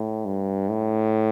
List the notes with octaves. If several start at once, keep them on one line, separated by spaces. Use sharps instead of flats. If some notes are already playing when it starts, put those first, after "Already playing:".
Already playing: A2
G2
A2